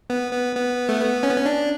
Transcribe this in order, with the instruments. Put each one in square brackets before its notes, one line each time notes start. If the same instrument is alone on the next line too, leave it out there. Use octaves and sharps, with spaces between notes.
[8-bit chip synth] B3
B3
B3
A3
B3
C#4
B3
C#4
D4